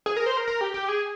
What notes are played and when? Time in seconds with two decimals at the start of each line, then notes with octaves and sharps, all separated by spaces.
0.06 G#4
0.16 A#4
0.26 C5
0.37 A#4
0.47 A#4
0.61 G4
0.74 G4
0.88 G#4